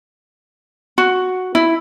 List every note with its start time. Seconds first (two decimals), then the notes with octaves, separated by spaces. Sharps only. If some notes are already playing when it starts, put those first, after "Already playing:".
0.98 F#4
1.55 E4